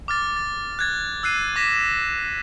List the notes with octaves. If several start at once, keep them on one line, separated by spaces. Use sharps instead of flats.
D6 F6 A6
A6
F#6 G#6 A6
E6 F#6 C7 D#7
D6 A#6 B6 E7